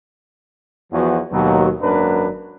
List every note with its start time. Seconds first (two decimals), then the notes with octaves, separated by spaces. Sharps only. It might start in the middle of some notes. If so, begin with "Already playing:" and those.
0.93 E2 F3 F#4
1.32 D#2 B2 F#3
1.82 G#1 F#2 A#3 D4 A#4 B4